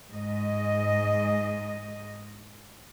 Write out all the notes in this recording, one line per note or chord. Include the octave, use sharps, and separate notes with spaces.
G#2 D#5